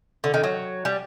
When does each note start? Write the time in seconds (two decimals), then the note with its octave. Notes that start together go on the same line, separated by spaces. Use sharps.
0.24 D3
0.34 D#3
0.44 F#3
0.85 G3